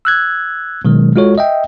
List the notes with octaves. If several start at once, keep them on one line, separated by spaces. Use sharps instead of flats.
E6 F#6 G#6
B2 D#3 F#3 G#3
G#3 F4 F#4 A4 C#5
D#5 E5 G5